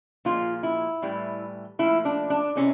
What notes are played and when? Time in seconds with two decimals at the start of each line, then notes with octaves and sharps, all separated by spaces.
0.25 A#2 F3 G#3 F4
0.63 E4
1.02 A2 E3 G3
1.79 A#2 F3 A3 E4
2.05 D4
2.30 D4
2.55 C3 E3 G#3 C#4